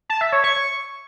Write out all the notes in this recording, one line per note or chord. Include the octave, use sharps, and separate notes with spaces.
A5
E5
C#5
C#6